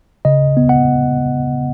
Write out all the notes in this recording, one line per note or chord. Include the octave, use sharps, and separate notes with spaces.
C#3 D#5
B3
F#5